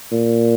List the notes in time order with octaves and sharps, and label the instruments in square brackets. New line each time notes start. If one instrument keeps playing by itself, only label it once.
[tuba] A#2